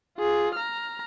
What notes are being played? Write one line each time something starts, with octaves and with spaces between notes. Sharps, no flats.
F4 G#4
A#5 F6